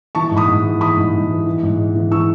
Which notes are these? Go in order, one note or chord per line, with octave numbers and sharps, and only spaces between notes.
E3 A5 C#6
G#2
B5 D#6
G#2
E3
E3 B5 D#6
G#2
G#2
E3
E3
G#2
G#2
E3
E3 C#6 E6